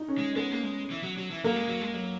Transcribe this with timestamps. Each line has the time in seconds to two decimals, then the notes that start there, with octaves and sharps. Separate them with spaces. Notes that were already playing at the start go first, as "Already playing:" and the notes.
Already playing: D#4
0.08 C#4
0.18 G#3
0.36 G#3 B3
0.52 A#3
0.63 G#3
0.90 E3
1.03 F#3
1.18 F#3
1.31 E3
1.44 F#3 A#3
1.56 G#3
1.68 F#3
1.81 G#3
1.94 F#3